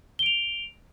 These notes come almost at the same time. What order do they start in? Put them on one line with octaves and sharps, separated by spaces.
G7 D7 F7